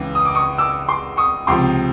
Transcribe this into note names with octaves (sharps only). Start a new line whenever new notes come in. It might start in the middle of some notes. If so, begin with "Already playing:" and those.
Already playing: C#2 C#3 E3
D#6
D6
C#6 D#6
D6 E6
C6 D6
C#6 D#6
C#2 C3 F3 C6 D6